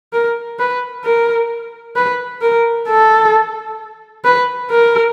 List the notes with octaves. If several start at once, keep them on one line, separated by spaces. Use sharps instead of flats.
A#4
B4
A#4
B4
A#4
A4
B4
A#4